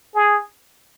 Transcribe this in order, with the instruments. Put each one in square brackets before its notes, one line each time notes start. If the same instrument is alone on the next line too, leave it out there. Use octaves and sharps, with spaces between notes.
[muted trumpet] G#4